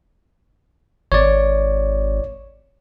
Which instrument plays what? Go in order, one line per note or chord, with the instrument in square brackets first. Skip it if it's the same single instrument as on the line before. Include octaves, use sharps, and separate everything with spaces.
[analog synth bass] G#1 [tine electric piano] C#5 D5